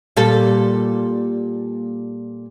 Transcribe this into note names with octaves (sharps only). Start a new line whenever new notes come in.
A#2 G3 A4